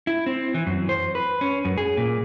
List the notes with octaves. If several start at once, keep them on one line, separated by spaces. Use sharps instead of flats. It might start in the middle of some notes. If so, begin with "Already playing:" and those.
E4
C4
E3
F#2
C5
B4
C#4
F#2
G#4
A#2